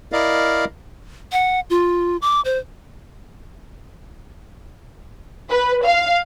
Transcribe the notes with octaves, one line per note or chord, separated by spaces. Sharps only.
E4 A#4 D5 D#5 F5
F#5
F4
D6
C5
B4
F5